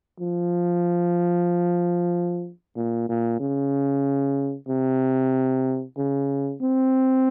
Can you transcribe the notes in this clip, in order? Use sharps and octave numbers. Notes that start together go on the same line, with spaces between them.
F3
A#2
A#2
C#3
C3
C#3
C4